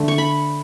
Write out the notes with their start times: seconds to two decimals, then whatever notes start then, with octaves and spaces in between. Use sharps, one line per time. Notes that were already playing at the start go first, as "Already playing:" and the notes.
Already playing: D3 A3
0.08 C#6
0.18 B5